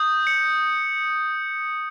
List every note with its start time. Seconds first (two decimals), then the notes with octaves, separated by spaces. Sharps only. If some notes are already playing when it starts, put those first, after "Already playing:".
Already playing: D#6 G6
0.27 C#7